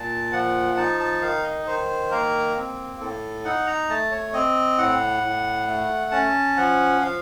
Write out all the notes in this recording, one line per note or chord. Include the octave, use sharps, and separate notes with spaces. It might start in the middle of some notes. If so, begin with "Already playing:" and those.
Already playing: A#2 A5
F3 F#5
D#4 A5
A5
D#3 F5
D#5
D#3 C5
A#3 A#4
C4
A2 A4
D#4 F#5
A#5
A3 A5
C#5
C4 D#5
A2 F#5
A2
A3
C#4 A5
F3 F#5
F3 F5